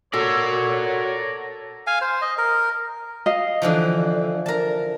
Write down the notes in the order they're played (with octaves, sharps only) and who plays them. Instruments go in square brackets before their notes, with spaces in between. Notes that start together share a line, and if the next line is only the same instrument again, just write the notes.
[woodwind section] F#4 C#5 [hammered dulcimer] A4 [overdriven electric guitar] A#4 D5
[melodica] F5 G#5
C5
D#5
A#4
[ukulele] D#5 F5
[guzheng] D3 E3 F3
A#4 A5